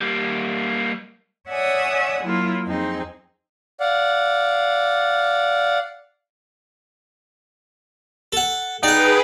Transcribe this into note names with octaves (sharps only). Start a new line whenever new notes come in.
G3 A#3
C#5 D5 E5 F#5 G#5 D#6
F#3 A#3 E4 F4
F2 C4 D#4 G#4
D5 F5 F#5
A4 F#5
D#4 G#4 B4 D5 F#5 G5